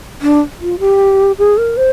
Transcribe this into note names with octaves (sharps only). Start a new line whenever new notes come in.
D4
F4
G4
G#4
A#4
C5